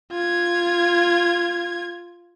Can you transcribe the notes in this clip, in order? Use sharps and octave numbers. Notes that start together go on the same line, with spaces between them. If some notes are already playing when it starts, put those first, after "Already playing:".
F4 G#6